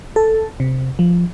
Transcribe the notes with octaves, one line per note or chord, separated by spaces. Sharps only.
A4
C3
F3